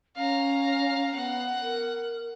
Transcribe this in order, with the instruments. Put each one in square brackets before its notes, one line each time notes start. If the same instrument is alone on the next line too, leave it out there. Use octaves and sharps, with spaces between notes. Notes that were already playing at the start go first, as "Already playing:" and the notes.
[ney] C#4 [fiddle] F5 A#5
[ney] B3 [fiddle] F#5
[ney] A#4